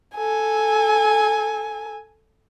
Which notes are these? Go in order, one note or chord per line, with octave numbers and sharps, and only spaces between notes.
A4 G#5